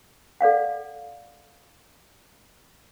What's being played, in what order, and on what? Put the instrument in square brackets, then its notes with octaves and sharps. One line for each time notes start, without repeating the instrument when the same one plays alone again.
[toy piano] A4 D5 F5 F#5